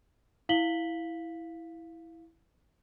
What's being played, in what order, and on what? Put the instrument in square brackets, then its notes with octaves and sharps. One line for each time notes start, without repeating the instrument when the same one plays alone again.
[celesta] E4 F5 B6 F#7 G7